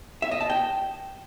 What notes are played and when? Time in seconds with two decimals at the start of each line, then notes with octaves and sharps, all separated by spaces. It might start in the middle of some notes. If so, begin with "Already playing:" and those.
0.22 E5
0.31 D#5
0.41 A5
0.50 G5